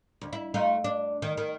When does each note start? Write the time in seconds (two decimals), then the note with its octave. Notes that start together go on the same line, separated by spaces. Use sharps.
0.21 D2
0.33 E4
0.54 A3 D#4 F4
0.84 D4
1.22 D#3
1.37 D#3